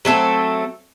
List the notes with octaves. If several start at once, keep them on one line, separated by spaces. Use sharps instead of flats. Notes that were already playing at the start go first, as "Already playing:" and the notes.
F#3 A3 C4 A4